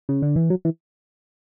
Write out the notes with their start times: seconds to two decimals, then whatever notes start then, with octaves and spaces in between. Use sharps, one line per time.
0.09 C#3
0.22 D3
0.36 E3
0.50 F#3
0.65 E3